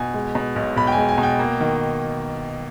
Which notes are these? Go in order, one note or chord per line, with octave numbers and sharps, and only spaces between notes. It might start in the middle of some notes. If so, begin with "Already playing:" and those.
Already playing: B2 G#5
G#3
B2
B1
B1 B5
G5
G#5
G#3
G#5
B2
G5
A#3
D#3